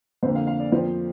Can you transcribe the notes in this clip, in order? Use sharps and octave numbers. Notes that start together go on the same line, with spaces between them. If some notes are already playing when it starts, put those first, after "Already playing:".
F2 D3 A#3 C5
F5
F5
D5
F2 F3 A#3 C5